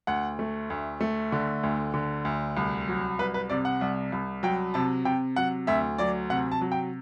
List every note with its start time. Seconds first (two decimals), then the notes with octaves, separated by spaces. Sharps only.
0.07 D2 F#5
0.39 A3
0.70 D2
1.01 A3
1.32 D3
1.63 D2
1.94 D3
2.25 D2
2.57 C2
2.88 F#3
3.19 C2 B4
3.34 B4
3.50 C3 D5
3.65 F#5
3.81 C2
4.12 C2
4.43 F#3 G5
4.74 C3 A5
5.05 C3 G5
5.36 F#3 F#5
5.67 D2 E5
5.99 F#3 D5
6.30 C3 F#5
6.52 A5
6.61 F#3
6.72 G5